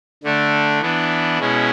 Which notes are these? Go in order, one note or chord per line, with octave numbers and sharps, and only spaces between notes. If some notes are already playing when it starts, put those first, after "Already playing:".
D3 A3 D4
E3 B3 D4
B2 G#3 C#4 E4